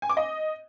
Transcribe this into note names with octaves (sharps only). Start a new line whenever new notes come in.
G#5
D6
D#5